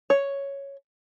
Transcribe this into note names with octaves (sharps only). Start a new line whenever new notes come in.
C#5